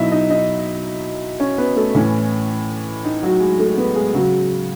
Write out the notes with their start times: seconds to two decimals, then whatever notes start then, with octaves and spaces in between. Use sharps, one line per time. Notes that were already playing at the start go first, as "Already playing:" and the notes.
Already playing: B2 F#3 D#4 E4 D#5 E5
0.12 D#4 D#5
0.30 D#4 D#5
1.40 C#4 C#5
1.58 B3 B4
1.76 A3 A4
1.94 A2 E3 C#4
3.05 D#4
3.23 F#3 F#4
3.40 G#3 G#4
3.59 A3 A4
3.77 B3 B4
3.96 G#3 G#4
4.14 C#3 F#3 F#4